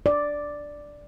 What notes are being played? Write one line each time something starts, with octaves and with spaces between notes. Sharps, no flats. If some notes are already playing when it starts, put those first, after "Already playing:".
D5